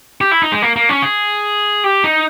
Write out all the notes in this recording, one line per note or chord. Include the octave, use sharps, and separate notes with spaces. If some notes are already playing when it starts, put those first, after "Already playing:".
G4
E4
D#4
G#3
A#3
A#3
C#4
G#4
G4
D#4